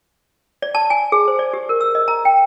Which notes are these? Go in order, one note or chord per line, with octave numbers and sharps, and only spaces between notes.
D5
A5
G#5
G#4
C5
D5
G4
A#4
E6
D#5
A#5
G5